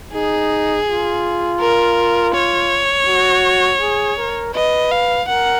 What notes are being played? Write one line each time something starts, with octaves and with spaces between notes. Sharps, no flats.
D#4 G#4
F4
A#4
C#5
F#4
G#4
A#4
B4 D#5
F5
A#4 F#5